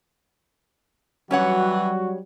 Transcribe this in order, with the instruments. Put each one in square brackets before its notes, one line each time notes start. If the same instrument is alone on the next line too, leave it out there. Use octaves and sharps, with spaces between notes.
[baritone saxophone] E3 [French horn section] F#3 G3 [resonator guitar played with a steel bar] C#4 C#5 F#5 [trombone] F#4